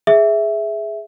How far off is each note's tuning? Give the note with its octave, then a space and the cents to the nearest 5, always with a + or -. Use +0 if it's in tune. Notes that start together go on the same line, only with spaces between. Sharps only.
G#4 +0 E5 +0